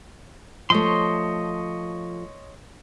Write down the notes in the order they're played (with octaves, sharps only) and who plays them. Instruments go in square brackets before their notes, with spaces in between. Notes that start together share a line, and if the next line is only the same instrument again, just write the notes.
[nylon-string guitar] F3 A3 [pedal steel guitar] C#5 D#5 C6